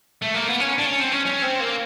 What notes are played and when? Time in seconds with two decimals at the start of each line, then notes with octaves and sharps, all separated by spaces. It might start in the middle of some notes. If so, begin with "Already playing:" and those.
0.22 A3
0.35 A#3
0.48 B3
0.60 C#4
0.78 D4
0.86 C#4
1.00 C4
1.12 C#4
1.26 C#4
1.42 C4
1.60 A#3